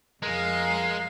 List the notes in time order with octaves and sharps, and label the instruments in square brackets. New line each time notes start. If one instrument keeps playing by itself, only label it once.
[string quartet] F2 F5 [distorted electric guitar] G#3 [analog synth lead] A#4